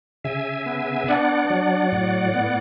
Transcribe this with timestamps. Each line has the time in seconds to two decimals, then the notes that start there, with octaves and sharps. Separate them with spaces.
0.24 C#3 E5 G#5
0.66 B3
1.08 D4 D5 F#5
1.50 F#3
1.92 A2
2.34 B3